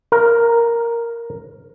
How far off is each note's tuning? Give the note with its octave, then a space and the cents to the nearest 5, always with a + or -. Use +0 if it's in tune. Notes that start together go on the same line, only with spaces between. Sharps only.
A#4 +0 F5 -20